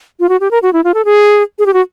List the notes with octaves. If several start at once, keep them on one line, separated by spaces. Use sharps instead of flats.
F4
F#4
G4
A#4
F#4
E4
F4
A4
G#4
G#4
G4
F#4